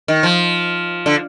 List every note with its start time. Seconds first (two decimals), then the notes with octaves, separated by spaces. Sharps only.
0.08 D#3
0.23 F3
1.06 D3